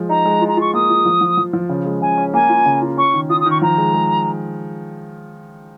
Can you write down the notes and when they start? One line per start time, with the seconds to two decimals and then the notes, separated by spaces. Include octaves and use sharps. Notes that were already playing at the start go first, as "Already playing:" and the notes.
Already playing: F3 G#3
0.09 D#4 A#5
0.25 G#3
0.41 F4
0.48 A#5
0.57 F4 C#6
0.74 A#3 D#6
0.89 F4
1.06 F3
1.21 F3
1.37 F3
1.53 F3
1.69 C#3
1.85 G#3
2.01 C#3 G#5
2.18 C#4
2.34 A#3 G#5
2.49 F4
2.66 C#3
2.81 F4
2.97 C#4 C#6
3.14 D#3
3.29 F4 D#6
3.40 D#6
3.46 D#3 C#6
3.62 F3 A#5
3.78 G#3
3.94 G#3